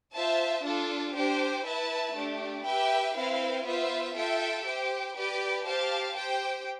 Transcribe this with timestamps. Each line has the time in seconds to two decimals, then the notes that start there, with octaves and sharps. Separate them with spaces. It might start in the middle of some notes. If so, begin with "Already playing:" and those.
0.15 F4 C5 E5 A5
0.64 D4 F4 A4
1.15 D4 G4 C5 G5
1.65 E4 B4 E5 A5
2.15 A3 D4 G4
2.65 G4 B4 E5 G5
3.16 C4 E4 B4 F5
3.65 B3 F4 C5 E5
4.16 F4 A4 E5 G5
4.66 G4 C5 G5
5.16 G4 B4 D5 G5
5.65 G4 C5 F5 A5
6.16 G4 C5 G5